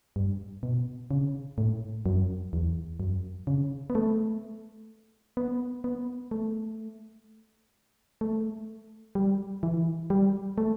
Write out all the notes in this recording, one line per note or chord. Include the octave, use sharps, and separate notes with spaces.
G2
B2
C#3
A2
F#2
E2
F#2
C#3
B3
A3
B3
B3
A3
A3
G3
E3
G3
A3